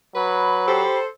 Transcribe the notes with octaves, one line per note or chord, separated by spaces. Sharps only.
F#3 B4 B5
G4 A4 C5